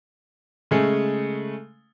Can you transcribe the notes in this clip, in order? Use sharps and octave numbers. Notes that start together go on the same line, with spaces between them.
C#3 G#3 A3